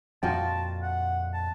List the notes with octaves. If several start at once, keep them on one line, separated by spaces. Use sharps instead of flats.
F2 A#2 F3 F4 F#4 G5 A5
F#5
A5